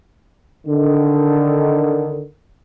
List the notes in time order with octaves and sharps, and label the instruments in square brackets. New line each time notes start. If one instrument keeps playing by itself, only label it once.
[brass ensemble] D3 D#3